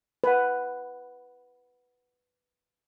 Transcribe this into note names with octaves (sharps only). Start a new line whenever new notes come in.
B4 F#5